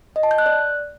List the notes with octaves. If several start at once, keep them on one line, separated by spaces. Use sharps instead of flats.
D#5
A5
G6
F#6
D5